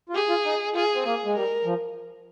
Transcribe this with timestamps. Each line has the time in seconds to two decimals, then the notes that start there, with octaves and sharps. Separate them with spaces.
0.09 F4
0.14 G4 G#4
0.29 F4
0.45 D#4
0.75 F4 G#4
0.95 C4
1.05 A#3 G#4
1.25 G#3
1.35 G3 A#4
1.65 F3